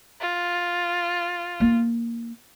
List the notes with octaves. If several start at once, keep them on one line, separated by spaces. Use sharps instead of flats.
F4
A#3 D#4